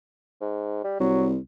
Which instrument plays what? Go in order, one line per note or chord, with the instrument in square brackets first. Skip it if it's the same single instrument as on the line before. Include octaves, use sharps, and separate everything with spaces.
[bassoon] G#2
G3
[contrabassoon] C2 [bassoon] F#3